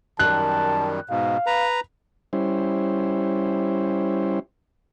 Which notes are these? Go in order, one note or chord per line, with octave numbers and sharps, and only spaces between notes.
F#2 D#3 G3 A5 F#6
G#2 B2 F5
B4 A#5
G3 C#4 E4 C5